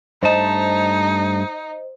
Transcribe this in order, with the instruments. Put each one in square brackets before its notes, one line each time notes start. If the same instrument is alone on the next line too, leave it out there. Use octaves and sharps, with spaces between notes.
[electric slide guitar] G2 A3 A5 [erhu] D#4 [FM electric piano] C5 D#5